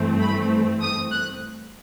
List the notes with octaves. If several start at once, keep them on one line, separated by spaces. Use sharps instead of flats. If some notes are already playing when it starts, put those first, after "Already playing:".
Already playing: G2 E3 A3 C4
B5
D#6
F#6